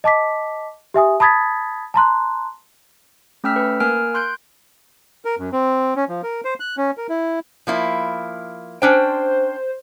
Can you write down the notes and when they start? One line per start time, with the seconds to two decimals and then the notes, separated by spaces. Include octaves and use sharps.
0.04 D#5 A5 D6 B6
0.94 G4 E5 G#5 D#6
1.20 A5 B5 D#6 G#6 A6 B6
1.94 A5 A#5 C6 F#6
3.44 A3 C#4 G5 E6 F6 B6
3.56 B4
3.80 A#3 A#4 G#5 F6 F#6 D7
4.14 C6 F#6 G6 D7
5.25 A#4
5.39 F#2
5.52 C4
5.96 C#4
6.09 F3
6.23 A#4
6.45 C5
6.60 F#6
6.77 C#4
6.97 A#4
7.09 E4
7.67 F3 A#3 E4
8.82 C#4 D4 C5 G5